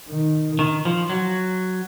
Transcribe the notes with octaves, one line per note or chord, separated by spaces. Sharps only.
D#3
D#3
F3
F#3